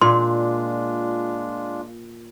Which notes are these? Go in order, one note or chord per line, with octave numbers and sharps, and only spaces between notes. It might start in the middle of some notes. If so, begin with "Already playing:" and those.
A#2 G#3 D4 F4 C6